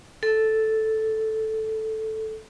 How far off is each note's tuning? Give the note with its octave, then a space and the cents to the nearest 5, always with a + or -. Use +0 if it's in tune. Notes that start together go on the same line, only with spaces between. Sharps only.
A4 -5